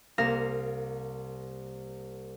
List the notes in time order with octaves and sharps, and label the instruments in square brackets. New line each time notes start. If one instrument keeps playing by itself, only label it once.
[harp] C2 A#3 F5 A#6 E7